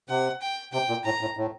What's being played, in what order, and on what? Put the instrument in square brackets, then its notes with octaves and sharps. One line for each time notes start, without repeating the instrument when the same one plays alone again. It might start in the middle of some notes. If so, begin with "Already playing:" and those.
[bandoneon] C3 [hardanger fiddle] F#5
[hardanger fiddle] G5
[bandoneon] C3 [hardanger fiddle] G5
[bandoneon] A#2
[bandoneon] A2 [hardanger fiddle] A#5
[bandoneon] A2
A2